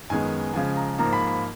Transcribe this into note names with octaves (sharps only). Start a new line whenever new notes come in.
F#2 D#3 G#3 B3 G#5
C#3 F3 G#3 G#5
A#5
G#2 F3 A#3 A#5
B5
B5